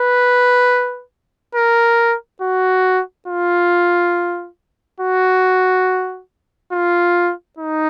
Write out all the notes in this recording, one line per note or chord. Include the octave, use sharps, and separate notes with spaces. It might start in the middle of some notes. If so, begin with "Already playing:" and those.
Already playing: B4
A#4
F#4
F4
F#4
F4
D#4